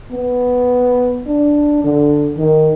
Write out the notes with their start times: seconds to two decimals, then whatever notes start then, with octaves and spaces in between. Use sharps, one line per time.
0.11 B3
1.27 D4
1.84 D3
2.38 D#3